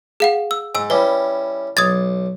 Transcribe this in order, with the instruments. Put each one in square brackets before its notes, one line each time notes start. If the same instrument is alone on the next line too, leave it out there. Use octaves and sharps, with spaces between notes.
[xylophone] G#4 F5 F#5
E6
[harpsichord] G#2 [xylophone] G#5 E6
[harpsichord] G3 C#4 E4 [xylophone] B4
[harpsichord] B1 [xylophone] D#6 G#6 A6